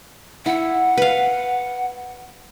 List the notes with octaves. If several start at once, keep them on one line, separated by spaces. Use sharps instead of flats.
E4 F#5
B4 F5